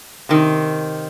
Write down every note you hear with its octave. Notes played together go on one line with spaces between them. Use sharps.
C3 D#3